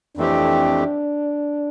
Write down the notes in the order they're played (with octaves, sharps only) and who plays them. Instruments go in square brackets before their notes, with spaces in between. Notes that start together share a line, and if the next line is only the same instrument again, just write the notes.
[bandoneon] F2 E3 A3 C4 G4 [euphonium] D4